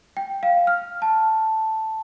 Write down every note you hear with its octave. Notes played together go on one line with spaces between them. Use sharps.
G5
F5
F6
A5